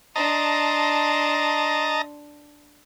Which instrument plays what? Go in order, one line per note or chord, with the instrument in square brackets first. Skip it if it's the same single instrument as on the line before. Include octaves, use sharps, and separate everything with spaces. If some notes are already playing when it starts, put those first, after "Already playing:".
[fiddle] D4 C6 [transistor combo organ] D#5 A5 A#5